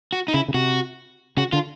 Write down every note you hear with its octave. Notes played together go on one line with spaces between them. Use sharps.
F#4
D#4
C#3 E4
C#3
C3 F#4
C#3 F#4
D3 F4